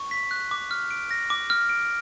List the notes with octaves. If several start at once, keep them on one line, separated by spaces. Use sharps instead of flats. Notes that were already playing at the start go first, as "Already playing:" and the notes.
Already playing: C#6
B6
F#6
D6
F6
D7
A#6
D6
F6
D7